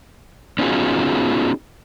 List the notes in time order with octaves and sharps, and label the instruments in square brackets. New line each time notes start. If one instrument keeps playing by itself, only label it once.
[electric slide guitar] B3 C#4 D#4 F4 F#4 G#4